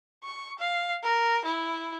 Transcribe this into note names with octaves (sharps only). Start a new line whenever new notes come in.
C#6
F5
A#4
E4